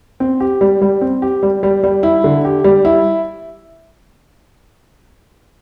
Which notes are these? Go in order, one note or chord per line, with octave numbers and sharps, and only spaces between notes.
C4
G4
G3
G3
C4
G4
G3
G3
G3
E4
D3
G4
G3
E4